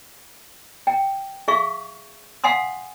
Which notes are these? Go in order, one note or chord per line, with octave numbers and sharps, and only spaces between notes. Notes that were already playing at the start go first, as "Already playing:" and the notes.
G5
G#4 E5 F5 C#6
F5 F#5 G#5 C6 D#6